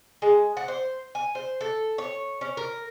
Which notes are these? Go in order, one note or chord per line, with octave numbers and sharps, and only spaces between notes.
G#3
F#5
C5
G#5
C5
A4
C#5
C#4
A#4